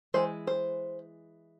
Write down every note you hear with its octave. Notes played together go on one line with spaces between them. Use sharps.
E3 G#3 C5
C5